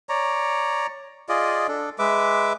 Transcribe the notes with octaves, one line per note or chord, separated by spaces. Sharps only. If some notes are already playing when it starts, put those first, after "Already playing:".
C#5 D5 A#5
F4 G#4 D5 D#5
D4 A4
G#3 B4 E5 D6